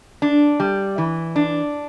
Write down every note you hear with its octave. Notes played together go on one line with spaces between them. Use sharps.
D4
G3
E3
D4